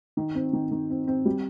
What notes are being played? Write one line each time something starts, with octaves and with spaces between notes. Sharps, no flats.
D#3
C4
D#3
D#3
C4
C4
G3